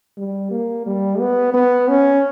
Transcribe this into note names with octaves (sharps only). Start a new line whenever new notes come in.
G3
A#3
G3
B3
B3
C#4